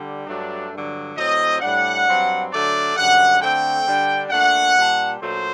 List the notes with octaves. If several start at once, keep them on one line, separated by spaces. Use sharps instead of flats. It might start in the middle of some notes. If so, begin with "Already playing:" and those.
Already playing: D3 G3
G2 F#3 A3 D4
G2 D3 F#3
A2 F#3 C4 D#5
A2 G3 D4 F#5
G2 F#3 C4
D3 F#3 A3 D4 D5
F#2 D3 G3 F#5
D3 A3 C4 G5
D3 G3 D4
A#2 A3 D4 F#5
A#2 G3 D4
A#2 F#3 A3 D4 C5